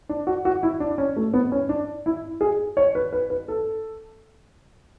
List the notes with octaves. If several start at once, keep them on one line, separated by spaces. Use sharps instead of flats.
D4
F#4
F#4
E4
D4
C#4
A3
B3
C#4
D4
E4
G#4
C#5
B4
B4
B4
A4